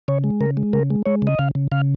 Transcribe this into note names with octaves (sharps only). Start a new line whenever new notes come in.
C#3 C#5
G#3
C#3 A#4
G#3
C#3 A#4
G#3
G#3 C#5
C#3 D#5
C#3 F5
C#3
C#3 F5